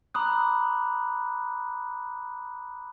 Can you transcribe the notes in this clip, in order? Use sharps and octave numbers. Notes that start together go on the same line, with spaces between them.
A#5 B5 D6 D#6 F#6